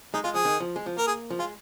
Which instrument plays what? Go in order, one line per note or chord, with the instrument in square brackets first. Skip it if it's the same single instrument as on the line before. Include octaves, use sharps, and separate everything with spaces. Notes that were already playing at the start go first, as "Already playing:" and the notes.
[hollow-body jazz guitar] G#3 [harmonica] D#4
[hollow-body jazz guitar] G#3 [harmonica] F4
[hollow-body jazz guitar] F3 [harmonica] G#4
[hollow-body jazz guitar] D#3
F3
G#3
F3
[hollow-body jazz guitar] A#3 [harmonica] A#4
[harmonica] G#4
[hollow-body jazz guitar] F3
[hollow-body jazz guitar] G#3 [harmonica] F4